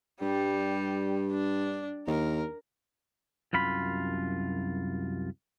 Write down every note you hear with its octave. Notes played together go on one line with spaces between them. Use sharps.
G2 G3
D4
D#2 A#4
C2 F#2 F4 B5